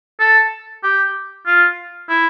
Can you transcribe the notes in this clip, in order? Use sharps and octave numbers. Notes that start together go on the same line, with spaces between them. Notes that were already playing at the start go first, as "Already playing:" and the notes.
A4
G4
F4
E4